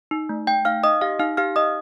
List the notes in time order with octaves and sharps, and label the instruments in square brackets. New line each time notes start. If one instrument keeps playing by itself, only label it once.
[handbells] D#4
A3
A3 G5 G6
D#4 F5 F6
D#4 D#5 D#6
G4 F5 F6
D#4 F5 F6
G4 F5 F6
D#4 D#5 D#6